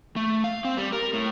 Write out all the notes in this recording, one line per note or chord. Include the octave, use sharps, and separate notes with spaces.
A3
F5
C4
G3
A#4
A2